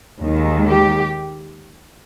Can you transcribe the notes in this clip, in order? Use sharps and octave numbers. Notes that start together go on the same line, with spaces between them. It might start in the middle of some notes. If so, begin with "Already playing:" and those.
D#2 D#3 G#3
G4